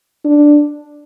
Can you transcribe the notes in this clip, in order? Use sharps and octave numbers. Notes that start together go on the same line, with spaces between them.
D4